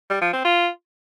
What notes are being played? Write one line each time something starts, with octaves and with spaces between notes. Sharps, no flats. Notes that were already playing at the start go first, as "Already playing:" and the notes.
G3
F3
C4
F4